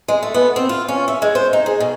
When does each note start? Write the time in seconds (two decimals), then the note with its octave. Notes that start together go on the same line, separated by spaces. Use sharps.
0.08 G#3
0.23 A3
0.34 B3
0.56 C4
0.69 F4
0.88 C#4
1.08 E5
1.22 G#3
1.35 C5
1.53 D#4
1.66 G#4
1.80 B2